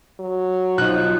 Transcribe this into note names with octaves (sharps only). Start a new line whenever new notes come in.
F#3
B1 F3 D#4 F#6